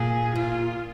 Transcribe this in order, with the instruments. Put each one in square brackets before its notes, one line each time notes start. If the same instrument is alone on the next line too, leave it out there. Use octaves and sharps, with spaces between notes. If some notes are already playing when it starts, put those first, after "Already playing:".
Already playing: [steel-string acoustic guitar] A#2 [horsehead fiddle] G#4
[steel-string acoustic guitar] A#2 [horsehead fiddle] F4